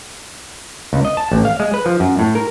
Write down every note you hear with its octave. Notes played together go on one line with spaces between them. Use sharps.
C#2
D#5
A5
A1
F5
G#3
B4
F3
F#2
A2
A#4